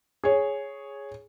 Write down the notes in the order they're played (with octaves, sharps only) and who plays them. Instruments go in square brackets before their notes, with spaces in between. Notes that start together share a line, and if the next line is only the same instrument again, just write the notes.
[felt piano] G#4 C#5